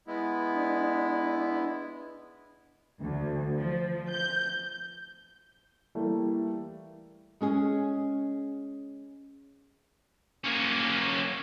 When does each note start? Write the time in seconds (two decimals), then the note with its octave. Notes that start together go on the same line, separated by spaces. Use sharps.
0.07 G#3 B3 E4
0.54 D4
3.01 D2
3.58 F3
4.10 G6
5.95 E3 G3 A3 A#3 E4
7.41 G#3 C#4 G#4
10.44 A#3 C#4